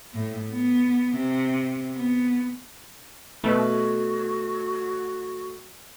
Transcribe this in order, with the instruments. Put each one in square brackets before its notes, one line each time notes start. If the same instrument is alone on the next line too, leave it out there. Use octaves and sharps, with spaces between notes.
[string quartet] A2
B3
C3
B3
[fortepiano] B2 B4 [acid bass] A3 [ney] F#4